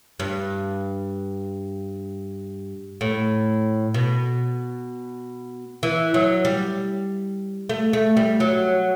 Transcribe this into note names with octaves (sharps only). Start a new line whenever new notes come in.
G2
A2
B2
E3
F#3
G3
A3
A3
G3
F#3